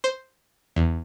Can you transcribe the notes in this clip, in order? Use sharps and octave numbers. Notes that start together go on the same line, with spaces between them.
C5
E2